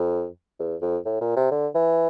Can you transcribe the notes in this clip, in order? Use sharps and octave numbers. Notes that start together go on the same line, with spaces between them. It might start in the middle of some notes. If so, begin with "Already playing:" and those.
Already playing: F2
E2
F2
A2
A#2
C3
D3
E3